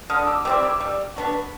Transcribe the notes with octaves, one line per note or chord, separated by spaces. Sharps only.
D3 D#6 F6
D6 E6
G3 C4 E4 D6 E6
D6 E6
G3
B3 D4 F#4